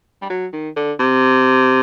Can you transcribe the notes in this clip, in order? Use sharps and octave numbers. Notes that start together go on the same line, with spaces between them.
G3
F#3
D#3
D3
C3